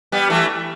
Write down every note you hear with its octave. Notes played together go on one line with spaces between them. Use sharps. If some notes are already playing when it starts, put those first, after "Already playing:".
G3 B3
E3 A3